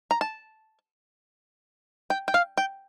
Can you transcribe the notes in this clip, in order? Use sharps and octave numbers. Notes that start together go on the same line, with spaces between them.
A#5
A5
G5
G5
F5
G5